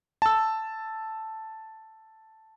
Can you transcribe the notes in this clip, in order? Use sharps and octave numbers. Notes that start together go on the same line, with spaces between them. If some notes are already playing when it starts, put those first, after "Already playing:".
A5 E6